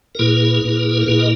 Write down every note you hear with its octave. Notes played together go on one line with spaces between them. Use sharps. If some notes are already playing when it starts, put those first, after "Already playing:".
A#4
A#2 A#3 E4 G#4 B4
A#2 A#3 E4
A#4
A#2 A#3 E4 G#4 B4
D#5